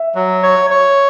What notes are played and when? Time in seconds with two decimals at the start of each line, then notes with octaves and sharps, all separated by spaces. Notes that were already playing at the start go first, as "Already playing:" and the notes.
Already playing: E5
0.15 F#3
0.43 C#5
0.70 C#5